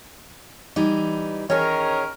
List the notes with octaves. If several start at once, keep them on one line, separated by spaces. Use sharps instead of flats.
E3 G3 D#4
D#3 C#4 G#4 A#4 C#5